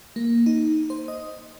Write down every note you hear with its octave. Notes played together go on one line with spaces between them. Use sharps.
A#3
D#4
C5
D#5